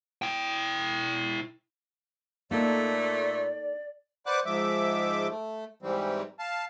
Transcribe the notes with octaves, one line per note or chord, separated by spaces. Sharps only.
E4 G5
A#2 A3 A#3 D#4 A4 D5
B4 C5 D5 F#5 D6 F#6
G#2 F3 G#3 E5 D6
A3
G#2 E3 G3 C4
F5 A5